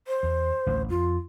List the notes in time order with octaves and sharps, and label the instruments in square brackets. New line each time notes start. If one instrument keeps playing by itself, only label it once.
[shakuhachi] C5
[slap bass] E2
A1 D2
[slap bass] F2 [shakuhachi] F4